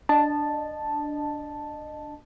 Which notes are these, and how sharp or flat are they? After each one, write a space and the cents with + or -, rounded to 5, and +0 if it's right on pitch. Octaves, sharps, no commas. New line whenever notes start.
D4 +0 D#5 -25 A5 +0